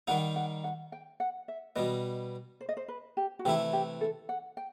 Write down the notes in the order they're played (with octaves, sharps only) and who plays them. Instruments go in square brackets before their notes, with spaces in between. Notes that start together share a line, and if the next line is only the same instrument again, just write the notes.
[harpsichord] D#3 G3 D#4 [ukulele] F#5
[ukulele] F#5
F#5
G5
F#5
E5
[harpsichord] B2 G3 B3 [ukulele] D#5
[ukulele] C5
D#5
C5
B4
G4
F#4
[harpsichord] C3 E3 A3 E4 [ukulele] G4
[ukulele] G4
A4
F#5
G5